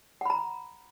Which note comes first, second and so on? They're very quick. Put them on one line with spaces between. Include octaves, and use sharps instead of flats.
F#5 B5 A#5